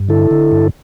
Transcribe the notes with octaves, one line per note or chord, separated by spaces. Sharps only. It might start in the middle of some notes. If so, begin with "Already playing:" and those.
Already playing: G2
D3 E4 A4
D3
G2